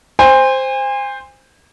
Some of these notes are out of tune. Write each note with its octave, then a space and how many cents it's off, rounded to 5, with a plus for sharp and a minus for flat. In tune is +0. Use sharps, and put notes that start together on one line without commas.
C5 +0 G#5 -40